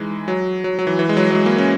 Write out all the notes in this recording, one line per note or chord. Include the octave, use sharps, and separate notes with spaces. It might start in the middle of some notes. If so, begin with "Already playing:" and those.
Already playing: E3 G#3 D#4
F#3
F#3
F#3
E3
E3
G#3
F#3
F#3
G#3
A#3
C#4